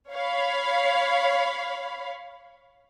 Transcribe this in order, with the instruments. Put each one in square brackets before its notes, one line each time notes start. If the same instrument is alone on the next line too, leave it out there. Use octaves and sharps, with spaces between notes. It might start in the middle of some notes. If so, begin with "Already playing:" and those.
[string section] C#5 F5 B5